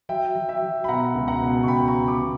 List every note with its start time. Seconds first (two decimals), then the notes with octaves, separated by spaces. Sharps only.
0.09 F#3 E5 G5
0.35 F#3
0.49 E5 G5
0.62 F#3
0.84 B5
0.88 B2 F#5 A#5
1.15 C#2
1.28 F#5 A#5
1.41 B2
1.63 C#6
1.67 C#2 G5 B5
1.88 A#5 C#6
1.94 B3
2.08 B5 D6
2.21 B2